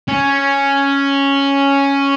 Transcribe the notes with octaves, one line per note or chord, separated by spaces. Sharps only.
C#4